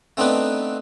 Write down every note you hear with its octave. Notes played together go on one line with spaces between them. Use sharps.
A3 B3 C4 D4 D#4 B4